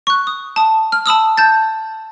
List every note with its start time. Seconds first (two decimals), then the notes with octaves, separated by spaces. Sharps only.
0.07 C#6 F#6
0.27 D#6
0.56 A5 D#6
0.92 F6
1.06 A5 B5 D#6 E6
1.37 A5 G6 A6